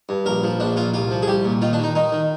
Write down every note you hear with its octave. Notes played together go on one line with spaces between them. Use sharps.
G2
A#1 A#4
F3
A#1 D4
A#2 F4
C2 F4
F3
G#4
C2 G4
A#2
D#3 F4
D4
D#3
D#4
D#3 D#4
D#3